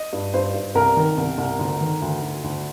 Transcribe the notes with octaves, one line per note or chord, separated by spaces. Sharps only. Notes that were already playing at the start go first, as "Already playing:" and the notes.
Already playing: D#5
G2
G2 C5
G2
C2 A#4
D#3
C2
C2
D2
D#3
D2
D2
D2